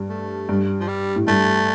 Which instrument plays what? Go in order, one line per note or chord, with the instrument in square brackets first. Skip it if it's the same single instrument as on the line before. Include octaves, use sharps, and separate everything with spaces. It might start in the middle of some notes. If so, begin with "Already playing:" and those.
Already playing: [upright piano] G2
[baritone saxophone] A3
[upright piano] G2
[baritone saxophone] F3
G3
[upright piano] A2
[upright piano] G2 [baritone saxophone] A3